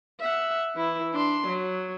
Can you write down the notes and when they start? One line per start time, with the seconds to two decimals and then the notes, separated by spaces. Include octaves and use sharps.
0.20 E5 F#5
0.75 E3 E4
1.13 D4 C6
1.47 F#3